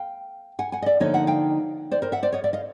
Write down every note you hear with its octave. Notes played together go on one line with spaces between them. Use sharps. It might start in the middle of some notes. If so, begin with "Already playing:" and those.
Already playing: F5 G5
F#5 G#5
F#5 G#5
D#5
D5 E5
D3 F3 A#3 D#4 C#5 D#5
E5 F#5
F5 G5
C5 D5
A#4 C5
E5 F#5
C5 D5
C#5 D#5
D5 E5
D#5 F5